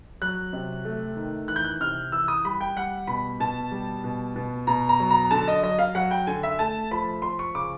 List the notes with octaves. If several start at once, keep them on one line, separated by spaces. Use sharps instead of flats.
F#3 F#6
C3
A3
D#3
E3 F#6
G6
F#6
C3 F6
E3 E6
D#6
G3 B5
G5
G3 F#5
B2 B5
B2 A5
G3
B2
B2
B2 A#5
A#5
F#3
A#5
D3 A5
D#5
F#3 D#5
F5
F#3 F#5
G5
D3 G#5
E5
A3 A5
F3 B5
F3 C6
C#6
C#3 D6